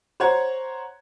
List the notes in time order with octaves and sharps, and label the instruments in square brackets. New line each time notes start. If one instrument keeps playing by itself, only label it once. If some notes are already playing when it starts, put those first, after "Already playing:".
[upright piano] C5 C#5 F#5 A#5 G#6